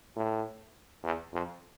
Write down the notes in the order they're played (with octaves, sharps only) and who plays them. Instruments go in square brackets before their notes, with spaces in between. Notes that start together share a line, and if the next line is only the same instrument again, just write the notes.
[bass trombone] A2
E2
F2